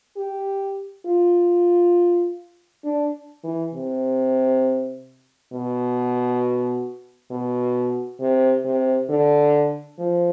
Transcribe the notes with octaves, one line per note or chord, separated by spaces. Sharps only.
G4
F4
D4
E3
C3
B2
B2
C3
C3
D3
F3